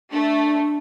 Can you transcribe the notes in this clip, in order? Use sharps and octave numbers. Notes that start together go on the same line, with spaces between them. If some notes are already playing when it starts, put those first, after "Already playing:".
A3 D4